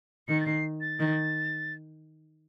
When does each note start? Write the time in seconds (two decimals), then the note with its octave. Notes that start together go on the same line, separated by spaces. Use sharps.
0.28 D#3 C#7
0.41 A6
0.46 C7
0.81 A6
0.99 D#3